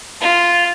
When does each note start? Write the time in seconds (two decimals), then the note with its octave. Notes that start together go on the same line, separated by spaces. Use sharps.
0.21 F4